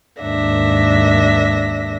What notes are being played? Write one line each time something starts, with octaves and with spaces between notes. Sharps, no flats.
D#2 G#2 D4 E5 A#6